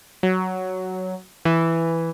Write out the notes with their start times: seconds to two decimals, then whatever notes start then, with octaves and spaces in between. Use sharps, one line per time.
0.23 F#3
1.45 E3